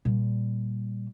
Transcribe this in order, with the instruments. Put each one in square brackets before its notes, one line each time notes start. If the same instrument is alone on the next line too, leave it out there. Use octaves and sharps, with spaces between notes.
[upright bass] A#2 G3